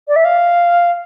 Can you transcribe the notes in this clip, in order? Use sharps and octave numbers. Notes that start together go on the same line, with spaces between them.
D5
E5
F5